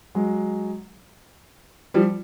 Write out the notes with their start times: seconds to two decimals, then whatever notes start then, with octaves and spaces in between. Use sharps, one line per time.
0.15 F#3 G#3
1.94 F3 G3